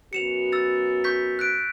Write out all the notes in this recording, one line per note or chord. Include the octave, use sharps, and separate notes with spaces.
F#2 B3 F#4 C#7 E7 F7
E6 A6
C#6 G6 B6
F#6 B6 D7